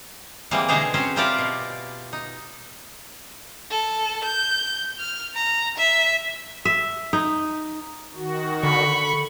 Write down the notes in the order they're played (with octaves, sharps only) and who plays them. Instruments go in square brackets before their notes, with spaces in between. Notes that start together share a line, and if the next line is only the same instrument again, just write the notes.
[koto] E3 G3 G#3 A#3 C4
B2 D3 G#3 G#4 C5 A#5
F#3 C4 C#4 C5
C4 E4 F4 G4 A#4 D5
B2
D#4
[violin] A4
G6
F6
A#5
E5
[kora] E5
D#4
[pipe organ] D#3 F#4
[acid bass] D3 [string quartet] B5 C#6